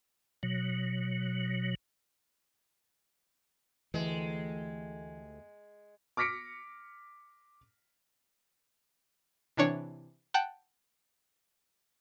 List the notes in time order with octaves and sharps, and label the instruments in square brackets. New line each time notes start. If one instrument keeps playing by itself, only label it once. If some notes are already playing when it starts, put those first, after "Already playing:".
[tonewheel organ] B2 F#3
[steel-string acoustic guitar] D2 A3 G4 [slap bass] E3 [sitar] G#3
[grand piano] D6 F6 A#6 B6 C#7 D7
[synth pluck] C3 E3 D4 C#5
F#5 G5 A5 F#6 G6